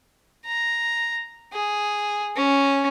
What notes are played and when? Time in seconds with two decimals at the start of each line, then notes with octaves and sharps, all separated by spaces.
0.46 A#5
1.52 G#4
2.36 C#4